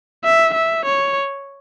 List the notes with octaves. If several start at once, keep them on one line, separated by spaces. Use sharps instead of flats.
E5
E5
C#5